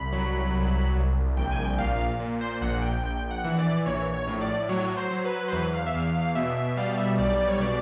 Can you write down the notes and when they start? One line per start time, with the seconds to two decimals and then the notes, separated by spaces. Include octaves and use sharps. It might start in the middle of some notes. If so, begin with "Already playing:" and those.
Already playing: C2 B5
0.12 F#3
0.54 C2
0.95 C2
1.37 A#1 G5
1.51 G#5
1.64 G5
1.78 A#2 F5
2.20 A#2
2.41 C5
2.61 A#1 F#5
2.82 G5
3.03 A#1 G5
3.31 F#5
3.45 E3
3.59 D5
3.86 A#1 C#5
4.14 C#5
4.28 A2
4.41 D5
4.69 F#3 C#5
4.97 C5
5.11 F#3
5.25 B4
5.48 C5
5.52 E2 B4
5.73 F5
5.86 E5
5.94 E2 F5
6.15 F5
6.35 B2 E5
6.57 E5
6.77 G3 F5
6.98 E5
7.19 B1 D5
7.48 C#5
7.60 B2 D5